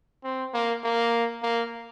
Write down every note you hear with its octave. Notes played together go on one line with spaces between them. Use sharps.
C4
A#3
A#3
A#3